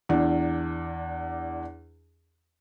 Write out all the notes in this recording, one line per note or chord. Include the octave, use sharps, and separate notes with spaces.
E2 D4